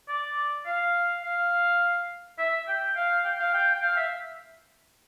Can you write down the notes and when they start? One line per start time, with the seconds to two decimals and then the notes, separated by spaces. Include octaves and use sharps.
0.08 D5
0.66 F5
1.23 F5
2.38 E5
2.68 G5
2.96 F5
3.24 G5
3.39 F5
3.54 G5
3.74 G5
3.82 F5
3.97 E5